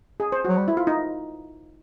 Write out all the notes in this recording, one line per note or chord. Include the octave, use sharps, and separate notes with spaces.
G#4
C5
F#3 F#4
G3
E4
F4
D#4